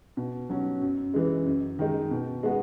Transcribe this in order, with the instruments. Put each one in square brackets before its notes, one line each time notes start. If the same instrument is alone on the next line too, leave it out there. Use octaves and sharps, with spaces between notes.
[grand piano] B2
F#3 C#4
F#2
E3 G#3
F#2
D#3 G#3 D#4
B2
G#3 B3 F#4